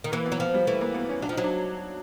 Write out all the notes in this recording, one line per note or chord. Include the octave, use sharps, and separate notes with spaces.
D#3
E3 A#3
B3
F#3
F3 B3
G3
E3 A3
A#3
B3
C#4
F#3 D4
F3
F#3 D#4
D4